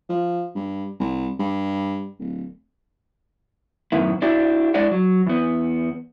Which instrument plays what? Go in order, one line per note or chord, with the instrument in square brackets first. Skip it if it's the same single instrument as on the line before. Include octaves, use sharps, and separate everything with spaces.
[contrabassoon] F3
G2
C2
G2
D1
[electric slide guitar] F#2 A2 D#3 B3 E4
D4 E4 F#4 G4 D5 E5
G#3 D4 E4 D5 D#5 F#5
F#3
E2 B3